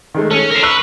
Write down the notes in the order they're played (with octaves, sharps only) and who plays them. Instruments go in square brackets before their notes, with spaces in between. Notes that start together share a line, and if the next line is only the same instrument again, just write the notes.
[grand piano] D#3 G#3 A3
[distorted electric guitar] C#4 [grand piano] A4
[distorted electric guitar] A#4 C5
[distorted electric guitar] B4 [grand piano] C#6 E6 F#6